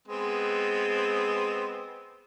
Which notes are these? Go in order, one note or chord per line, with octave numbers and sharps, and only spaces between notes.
G#3 B3 C4